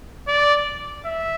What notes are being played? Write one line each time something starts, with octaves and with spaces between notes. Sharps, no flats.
D5
E5